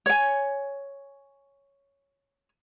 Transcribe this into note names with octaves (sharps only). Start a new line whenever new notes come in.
C#5 G#5